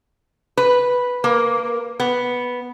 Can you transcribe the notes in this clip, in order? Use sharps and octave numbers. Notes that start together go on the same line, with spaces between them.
B4
A#3
B3